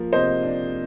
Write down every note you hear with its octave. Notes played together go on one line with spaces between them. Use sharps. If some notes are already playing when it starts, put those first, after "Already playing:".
Already playing: F3 A#3
C3 C5 D#5
D4